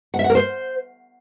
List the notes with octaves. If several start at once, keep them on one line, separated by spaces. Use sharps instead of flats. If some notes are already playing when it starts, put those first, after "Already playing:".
F#5
E5
F#5
A#4
C5